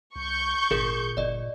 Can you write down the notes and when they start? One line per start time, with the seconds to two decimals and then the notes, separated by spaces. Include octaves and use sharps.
0.16 C2 C#6 G6
0.71 G#1 A#2 G#4 A#4
1.17 G1 D5 D#5